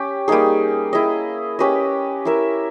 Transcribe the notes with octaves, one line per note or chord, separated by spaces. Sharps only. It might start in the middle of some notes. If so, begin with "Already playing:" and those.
Already playing: C#4 G4
G3 A#3 D#4 G#4
E4 G#4 D#5
C#4 G4 B4 D#5
E4 A#4 E5